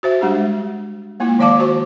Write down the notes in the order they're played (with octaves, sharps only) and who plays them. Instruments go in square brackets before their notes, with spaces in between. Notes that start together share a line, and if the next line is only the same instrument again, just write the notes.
[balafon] F#4 C5 E5
G3 G#3 D4 G4
G#3 A#3 E4 F4
D#3 F3 D5 F5 A5 D6
F#4 C5 C#6